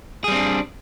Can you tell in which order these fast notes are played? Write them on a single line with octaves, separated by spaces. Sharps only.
G#4 G3 C4 D4